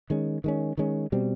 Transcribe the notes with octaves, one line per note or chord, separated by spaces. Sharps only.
D#3 G#3 C#4
D#3 G#3 C#4
D#3 G#3 C#4
B2 G3 C4